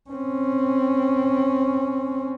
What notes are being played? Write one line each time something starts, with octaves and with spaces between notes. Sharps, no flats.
C4 C#4